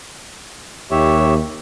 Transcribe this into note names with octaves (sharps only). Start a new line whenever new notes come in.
D#2 G4 C#5 E5